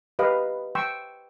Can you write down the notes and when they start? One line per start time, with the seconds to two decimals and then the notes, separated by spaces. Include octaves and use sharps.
0.19 G4 B4 D#5 F5
0.75 G5 C6 C#6 E6